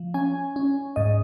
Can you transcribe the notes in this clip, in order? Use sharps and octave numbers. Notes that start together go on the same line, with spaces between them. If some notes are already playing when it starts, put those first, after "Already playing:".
Already playing: F3
C#4 G#5
C#4
G#2 D#5